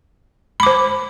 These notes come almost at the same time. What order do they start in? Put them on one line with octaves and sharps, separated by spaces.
B5 D6 C5